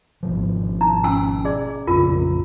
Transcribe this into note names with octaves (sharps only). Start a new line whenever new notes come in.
G#1 B2 F3
D#4 A#5
C#4 G#5 E6
G#4 D5
A#1 F2 C#3 F4 A#4